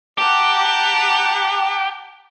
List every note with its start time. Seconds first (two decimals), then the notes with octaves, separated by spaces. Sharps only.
0.18 G4 F#5 A5 A#5